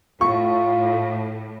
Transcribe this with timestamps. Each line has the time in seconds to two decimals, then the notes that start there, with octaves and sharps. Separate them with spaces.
0.21 A2 F4 C#6